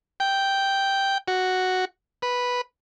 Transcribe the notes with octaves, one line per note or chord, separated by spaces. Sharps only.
G5
F#4
B4